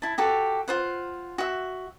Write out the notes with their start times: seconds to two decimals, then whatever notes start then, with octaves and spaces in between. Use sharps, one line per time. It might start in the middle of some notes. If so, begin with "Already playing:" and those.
0.02 E4 A5
0.18 F#4 G4 A4
0.68 F4 C5 F#5
1.38 F#4 E5